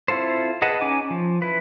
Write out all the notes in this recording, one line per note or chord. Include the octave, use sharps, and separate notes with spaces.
C4 E4 F4 A4 C5
G#4 B4 D#5 F#5 A5
C#4 D#4 G#5 D6
F3
E4 B4